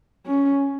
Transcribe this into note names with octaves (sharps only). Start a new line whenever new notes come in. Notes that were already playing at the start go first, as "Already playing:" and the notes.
C#4